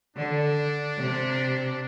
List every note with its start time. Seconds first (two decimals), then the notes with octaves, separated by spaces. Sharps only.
0.16 D3 D4
0.98 C3